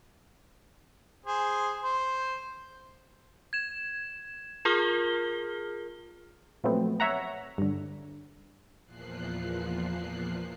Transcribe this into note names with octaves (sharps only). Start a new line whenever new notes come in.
G#4 C5
C5
G#6 E7
F4 G#4 A#4 F6 G7
A#2 F3 F#3 A3 B3 C4
C#5 E5 F#5 A#5
G2 D3
E2 A#2 F3 F#6 C7